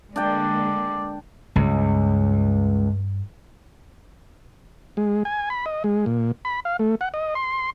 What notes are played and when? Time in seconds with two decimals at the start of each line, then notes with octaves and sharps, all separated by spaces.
0.16 D3 G#3 A#3 D4 D5 G5
1.56 C#2 G2
4.97 G#3
5.25 G#5
5.50 B5
5.66 D#5
5.84 G#3
6.06 A#2
6.45 B5
6.65 F5
6.79 A3
7.01 F#5
7.14 D#5
7.35 C6